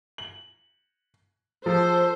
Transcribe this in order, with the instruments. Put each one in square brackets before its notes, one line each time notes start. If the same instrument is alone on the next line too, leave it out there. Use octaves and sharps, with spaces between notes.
[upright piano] F#7
[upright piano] F3 [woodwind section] G#4 A4 [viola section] C5